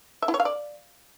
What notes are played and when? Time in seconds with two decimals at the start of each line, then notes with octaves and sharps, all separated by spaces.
0.22 E5
0.28 E4
0.34 C#5
0.40 F5
0.45 D5